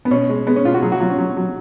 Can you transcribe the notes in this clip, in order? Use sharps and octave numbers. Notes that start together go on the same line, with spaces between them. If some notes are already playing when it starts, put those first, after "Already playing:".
B3
B2 C#4
G#3
G#3 B3
C#4
B2 F4
F#4
F#3 G#4
F#4
F#3 F4
C#4
F#3
F#3